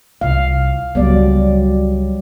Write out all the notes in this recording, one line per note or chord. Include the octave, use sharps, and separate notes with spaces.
C2 F5
C#2 F#3 G3 B3 D5